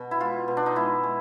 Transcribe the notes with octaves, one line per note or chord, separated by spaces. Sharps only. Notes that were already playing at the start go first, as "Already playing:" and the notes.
Already playing: B2 F#4
E4
G#3 F4
B2
D4
D#4
G#3 E4
G#3